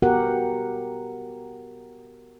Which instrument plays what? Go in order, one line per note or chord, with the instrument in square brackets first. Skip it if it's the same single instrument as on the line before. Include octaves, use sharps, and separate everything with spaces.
[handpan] B3 F#4 G4 A#4 F#5